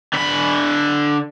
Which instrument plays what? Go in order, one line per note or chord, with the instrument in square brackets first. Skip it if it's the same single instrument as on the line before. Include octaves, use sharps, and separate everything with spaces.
[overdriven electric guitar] D3 B5